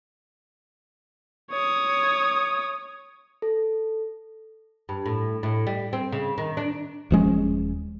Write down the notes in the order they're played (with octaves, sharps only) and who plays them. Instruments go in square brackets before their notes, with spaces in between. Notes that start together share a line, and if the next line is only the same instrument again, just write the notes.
[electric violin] C#5 D#6
[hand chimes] A4
[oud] G2
A2
A2
G3
C4
C#3
D#3
D4
[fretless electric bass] D#1 F3 G#3 C#4